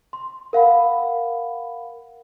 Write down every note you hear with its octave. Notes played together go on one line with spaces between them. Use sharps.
C6
A#4 F5 F#5 B5